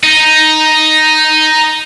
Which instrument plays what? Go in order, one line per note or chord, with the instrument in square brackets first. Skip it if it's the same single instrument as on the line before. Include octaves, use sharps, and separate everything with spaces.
[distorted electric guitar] D#4